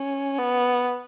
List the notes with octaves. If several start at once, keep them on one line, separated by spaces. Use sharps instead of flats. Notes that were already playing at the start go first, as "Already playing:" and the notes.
Already playing: C#4
B3